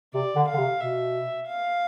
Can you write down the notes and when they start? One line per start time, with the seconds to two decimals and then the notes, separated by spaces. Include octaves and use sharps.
0.13 C3 D5
0.36 D3
0.47 F5
0.54 D3
0.58 C3
0.80 B2 E5
1.47 F5